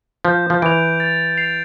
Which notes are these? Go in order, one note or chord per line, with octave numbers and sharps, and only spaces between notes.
F3 G6
F3
E3 D7 F7
A6
C7 F7